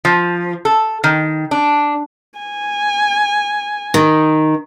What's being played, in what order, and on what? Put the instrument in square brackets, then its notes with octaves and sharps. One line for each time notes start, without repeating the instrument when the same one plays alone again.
[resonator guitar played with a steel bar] F3
A4
D#3
D4
[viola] G#5
[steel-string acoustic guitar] D#3